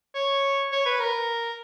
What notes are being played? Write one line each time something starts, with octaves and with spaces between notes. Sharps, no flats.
C#5
C#5
B4
A#4